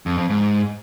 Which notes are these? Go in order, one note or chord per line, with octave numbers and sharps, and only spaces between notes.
F2
F2
G#2